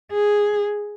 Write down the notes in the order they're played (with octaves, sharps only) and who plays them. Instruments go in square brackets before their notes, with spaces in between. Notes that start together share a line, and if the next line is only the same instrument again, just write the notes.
[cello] G#4